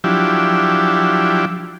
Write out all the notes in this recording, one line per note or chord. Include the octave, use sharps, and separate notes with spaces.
F3 F#3 D4 E4 G4